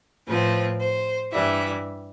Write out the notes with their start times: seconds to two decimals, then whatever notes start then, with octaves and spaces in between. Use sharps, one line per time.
0.26 A2 F3 C4 B4
0.79 C5
1.31 G2 E3 G3 E5